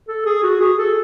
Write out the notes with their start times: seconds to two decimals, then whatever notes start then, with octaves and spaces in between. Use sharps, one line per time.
0.08 A4
0.26 G#4
0.43 F#4
0.61 G#4
0.79 A4